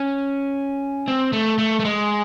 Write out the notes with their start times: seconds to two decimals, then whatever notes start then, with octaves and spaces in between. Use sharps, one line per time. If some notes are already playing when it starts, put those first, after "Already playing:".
Already playing: C#4
1.08 C4
1.33 A3
1.58 A3
1.80 A3
1.85 G#3